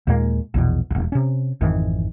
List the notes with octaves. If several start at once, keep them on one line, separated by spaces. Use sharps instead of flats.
D#2 A#2 G#3 A#3
A#1 E2 B2
E1 C2
C3 C#4
G#1 F2 D#3 E3